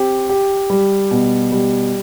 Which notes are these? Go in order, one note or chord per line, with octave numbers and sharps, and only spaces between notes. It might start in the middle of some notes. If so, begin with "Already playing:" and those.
Already playing: C4 G4
G4
G3
B2
G3